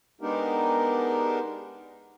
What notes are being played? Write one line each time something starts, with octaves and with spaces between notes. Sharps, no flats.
G#3 B3 D4 D#4 G4 A#4